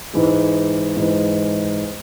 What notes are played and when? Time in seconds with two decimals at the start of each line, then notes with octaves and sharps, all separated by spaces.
0.13 G#2 E3 G#3
0.97 G#2 E3 G#3